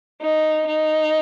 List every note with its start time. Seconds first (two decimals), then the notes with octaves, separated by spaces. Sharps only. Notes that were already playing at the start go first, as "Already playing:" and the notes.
0.22 D#4
0.67 D#4